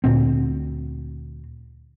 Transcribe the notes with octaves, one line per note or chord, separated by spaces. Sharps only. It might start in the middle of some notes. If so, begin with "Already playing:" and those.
D2 A#2 C4